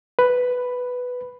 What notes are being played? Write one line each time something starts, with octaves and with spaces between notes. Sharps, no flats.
B4